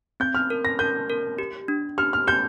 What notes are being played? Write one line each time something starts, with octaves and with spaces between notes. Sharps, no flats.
C4 G6
F6
A#4
A#6
A#4 G6
A#4
G4
D4
G4 F6
F6
G4 G6